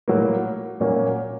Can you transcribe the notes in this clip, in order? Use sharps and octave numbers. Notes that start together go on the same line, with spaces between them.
A2 F#3 A#3
A#2 F#3 A#3 C#4